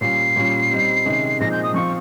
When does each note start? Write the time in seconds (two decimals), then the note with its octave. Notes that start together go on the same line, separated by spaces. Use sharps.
0.01 A#2 G3 C#4 F4 C7
0.36 A#2 G3 C#4 F4
0.71 G3 C4 D#4
1.06 C3 D#3 G#3 C#4
1.40 A#2 F3 G#3 C4 D#4 A#6
1.51 G6
1.63 D#6
1.74 F3 C4 F4 C#6